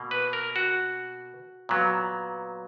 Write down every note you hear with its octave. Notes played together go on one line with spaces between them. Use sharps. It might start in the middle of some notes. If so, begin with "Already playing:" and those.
Already playing: B2 A#3
B4
A#4
F#4
A#2 F#3 B3